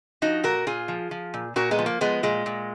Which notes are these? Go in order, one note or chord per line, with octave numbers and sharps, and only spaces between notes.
F3 D#4 F#4
A#2 F#4 A#4
A#2 F4 G#4
F3
F3
A#2
A#2 F#4 A#4
G#3 B3
F3
A#3
F3 G#3 B3
A#2 G#3
A#2